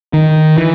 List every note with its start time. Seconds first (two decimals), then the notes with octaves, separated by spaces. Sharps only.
0.13 D#3
0.58 E3